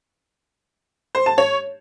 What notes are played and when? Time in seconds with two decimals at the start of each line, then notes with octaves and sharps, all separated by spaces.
1.15 C5
1.26 A5
1.38 C#5